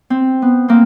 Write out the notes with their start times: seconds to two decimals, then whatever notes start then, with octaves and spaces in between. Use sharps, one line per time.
0.10 C4
0.42 B3
0.68 A#3 C4